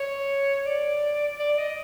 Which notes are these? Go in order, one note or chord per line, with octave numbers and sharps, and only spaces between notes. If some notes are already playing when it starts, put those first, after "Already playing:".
Already playing: C#5
D5
D5
D#5